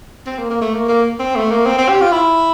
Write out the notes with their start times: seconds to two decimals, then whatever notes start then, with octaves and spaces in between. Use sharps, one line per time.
0.26 C4
0.38 A#3
0.50 A#3
0.61 A3
0.74 A#3
0.89 A#3
1.19 C4
1.36 A3
1.51 A#3
1.66 C4
1.78 C4
1.89 G4
2.01 F4
2.12 E4